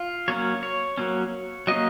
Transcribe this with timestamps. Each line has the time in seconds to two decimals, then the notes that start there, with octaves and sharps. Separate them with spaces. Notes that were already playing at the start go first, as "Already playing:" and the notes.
Already playing: F4
0.28 F#3 A#3 C#4 C#5
0.63 C#5
0.98 F#3 A#3 C#4
1.67 F#3 A#3 C#4 D#5